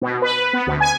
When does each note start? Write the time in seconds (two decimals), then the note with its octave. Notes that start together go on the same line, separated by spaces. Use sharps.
0.01 B2
0.22 B4
0.53 B3
0.67 D2
0.80 G#5